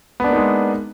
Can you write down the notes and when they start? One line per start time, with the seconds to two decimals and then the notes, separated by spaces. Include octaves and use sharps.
0.20 B3
0.24 D4
0.28 A#3
0.33 D#4
0.37 G#3